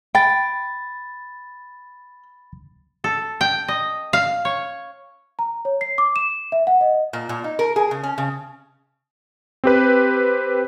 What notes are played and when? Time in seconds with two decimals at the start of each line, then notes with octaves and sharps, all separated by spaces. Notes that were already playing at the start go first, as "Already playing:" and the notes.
0.15 G5 B5 A6
3.04 A4
3.41 G5
3.68 D#5
4.13 F5
4.45 C#5
5.39 A#5
5.65 C#5
5.81 C7
5.98 D6
6.16 E7
6.52 E5
6.67 F#5
6.81 D#5
7.13 A#2
7.29 A#2
7.44 D#4
7.59 A#4
7.76 G#4
7.91 C#3
8.03 C#4
8.18 C#3
9.64 C4 G4 B4